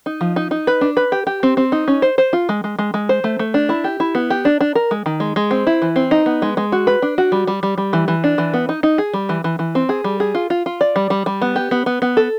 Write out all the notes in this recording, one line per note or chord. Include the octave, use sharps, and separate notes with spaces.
D#4
F3
D#4
D#4
B4
D4
B4
G4
G4
C4
C4
D#4
C#4
C5
C5
F4
G#3
G#3
G#3
G#3
C5
A3
A3
D4
E4
G4
E4
B3
G4
D4
D4
A#4
G#3
D#3
G#3
G#3
C4
E4
E3
C4
D#4
B3
G#3
G#3
F#4
B4
D4
F#4
G3
G3
G3
G3
E3
E3
D4
E3
B3
D#4
D#4
G#4
G3
E3
E3
E3
C4
G#4
G3
G#4
F4
F4
F4
D5
G3
G3
G3
B3
G4
B3
B3
B3
A4